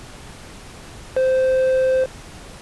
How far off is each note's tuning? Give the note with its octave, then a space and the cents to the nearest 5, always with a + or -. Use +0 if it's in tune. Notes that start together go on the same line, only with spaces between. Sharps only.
C5 -10